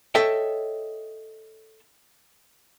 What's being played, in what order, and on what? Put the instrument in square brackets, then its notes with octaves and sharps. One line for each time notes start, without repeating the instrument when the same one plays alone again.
[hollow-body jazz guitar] A4 C#5 D#5 E5 G5